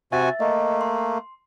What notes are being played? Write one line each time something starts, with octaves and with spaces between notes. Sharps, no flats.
C3 F#4 E5 G#5 A6
A3 A#3 D#5
C6